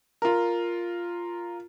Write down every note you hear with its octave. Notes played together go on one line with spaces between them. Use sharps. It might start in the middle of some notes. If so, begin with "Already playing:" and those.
F4 A#4